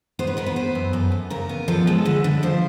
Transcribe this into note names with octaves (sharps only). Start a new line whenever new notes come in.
B3 C5
B4
B3 A#4
B4
B3 C5
F#2
F#2 A4
F#2
C#3 A#4
B3
F3 A4
G#3
D3 B4
D3
F3 C5